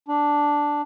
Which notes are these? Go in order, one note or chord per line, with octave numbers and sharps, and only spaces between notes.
D4